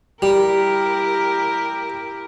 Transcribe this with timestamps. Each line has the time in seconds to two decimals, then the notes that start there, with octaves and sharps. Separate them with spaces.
0.22 G3 E4 G4 A#4